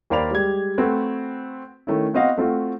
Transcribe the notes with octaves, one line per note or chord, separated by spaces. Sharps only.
D#2 A#3 C5 D5 B5 F7
G3 G#3 G4 G#6
A3 C4 F#4 B4
D#3 A3 C#4 E4
B3 C4 F#4 D#5 F5
A3 C4 F4 F#4